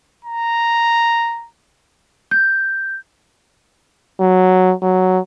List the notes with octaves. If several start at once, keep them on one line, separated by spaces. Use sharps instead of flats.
A#5
G6
F#3
F#3